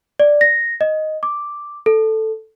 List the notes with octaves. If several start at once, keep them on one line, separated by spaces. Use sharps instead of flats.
D5
A#6
D#5
D6
A4